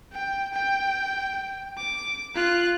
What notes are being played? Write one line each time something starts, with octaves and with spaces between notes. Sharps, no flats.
G5
G5
D6
F4 F#6